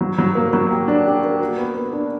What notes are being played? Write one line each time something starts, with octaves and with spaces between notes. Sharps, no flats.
F#3
F#3
A#3
F#3
G4
D4
G4
A#3
F#4
B3
B3
D4